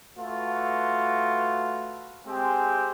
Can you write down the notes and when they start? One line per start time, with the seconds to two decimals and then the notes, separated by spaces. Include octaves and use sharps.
0.18 A3 F4 F#4 B4
2.28 G#3 C4 G4 G#5